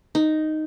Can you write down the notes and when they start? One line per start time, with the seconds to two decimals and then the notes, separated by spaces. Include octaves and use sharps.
0.15 D#4